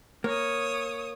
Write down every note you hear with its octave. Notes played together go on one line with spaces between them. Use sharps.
A#3 C#5 D#6